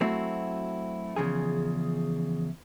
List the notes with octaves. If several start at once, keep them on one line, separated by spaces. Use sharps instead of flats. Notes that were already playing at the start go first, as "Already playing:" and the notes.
F#3 A3 C4 E4 F#4
E2 C#3 F3 G#4